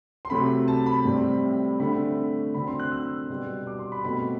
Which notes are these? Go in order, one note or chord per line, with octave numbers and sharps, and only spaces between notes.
C6
C3 F#3 A3 C4 B5
A5
B5
A2 G3 C4
D3 A3 C4 B5
D3 F#3 C4 B5
C6
F#6
E6
B2 G3 B3
D6
C6
B5
B2 F#3 A3 C4 B5